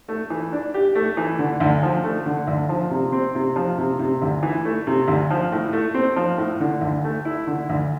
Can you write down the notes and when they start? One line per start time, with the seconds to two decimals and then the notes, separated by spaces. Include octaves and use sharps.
0.08 A3
0.30 E3
0.52 D4
0.74 G4
0.95 A3
1.17 E3
1.39 D3
1.60 D2
1.83 F3
2.04 A3
2.26 D3
2.47 D2
2.69 F3
2.91 C3
3.12 C4
3.35 C3
3.56 F3
3.78 C3
3.99 C3
4.22 D2
4.43 E3
4.65 A3
4.87 C3
5.08 D2
5.30 F3
5.52 A2
5.73 A3
5.94 C4
6.16 F3
6.38 A2
6.60 D3
6.81 D2
7.04 A3
7.25 E4
7.47 D3
7.69 D2